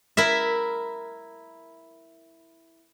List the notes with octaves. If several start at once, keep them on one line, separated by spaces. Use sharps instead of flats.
E4 A#4 E5